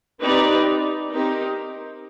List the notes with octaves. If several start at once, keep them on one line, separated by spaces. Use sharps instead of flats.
C4 D#4 G4 B4 D5
C4 D#4 G4 A#4